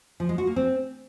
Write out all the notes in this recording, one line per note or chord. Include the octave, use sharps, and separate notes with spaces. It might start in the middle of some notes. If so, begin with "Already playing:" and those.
F3
G#3
F#4
A#3
C4